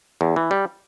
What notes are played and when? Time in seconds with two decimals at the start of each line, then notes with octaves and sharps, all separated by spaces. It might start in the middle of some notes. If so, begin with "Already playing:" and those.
0.21 E2
0.36 E3
0.51 G3